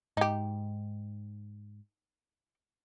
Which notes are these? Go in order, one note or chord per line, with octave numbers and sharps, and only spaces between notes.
G#2 D#4 G4